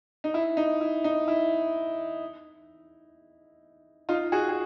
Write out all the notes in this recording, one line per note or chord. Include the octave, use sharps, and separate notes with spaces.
D#4
E4
D#4
E4
D#4
E4
D#4 F4
F#4 G#4
G#4